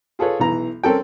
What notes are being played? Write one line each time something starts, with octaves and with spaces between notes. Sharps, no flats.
F4 G#4 A4 B4 C#5
B1 E3 A#5
C4 C#4 A4 A#4 G5